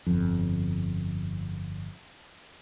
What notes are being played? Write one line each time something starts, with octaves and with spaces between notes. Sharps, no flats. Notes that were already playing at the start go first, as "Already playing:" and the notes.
G1 F2